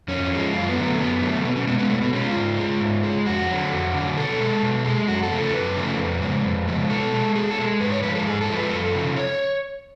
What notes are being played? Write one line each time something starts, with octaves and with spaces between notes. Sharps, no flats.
F2 C#4
F3
G#3
F#2 F4
B3
D3 F#3 A3
B3
F#2 B3
D3 F#3 A3
B2 B3
C#4
G#3 B3
B3
B2 A3
B3
G#3 C#4
F4
G#2
G#3
G#2
G#3
F2 F#4
D3 F#3
F2
D3
F#3
B2 A4
G#3
B2
G#3
F#2 F#4
A4
C#3 F3 A3
A4
F#2 B4
C#3 F3 A3
F2
C#3 F3 G#3
F2
C#3 F3 G#3
B2 A4
G#3
B2 G#4
A4
G#3
G#2 B4
C#5
F3 G#3 B4
A4
G#2 G#4
A4
F3 G#3
B4
F#2 A4
C#3 F3
C#5